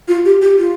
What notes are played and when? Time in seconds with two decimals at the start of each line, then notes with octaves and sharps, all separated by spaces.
0.08 F4
0.25 G4
0.42 G4
0.58 F4